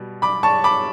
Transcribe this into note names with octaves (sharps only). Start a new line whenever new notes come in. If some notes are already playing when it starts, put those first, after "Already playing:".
Already playing: B2 G3
B5 D6
A5 C#6
B5 D6